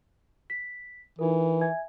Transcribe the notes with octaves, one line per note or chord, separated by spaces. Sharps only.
B6
E3 D#4 F4 A#4
E5 G#5 G#6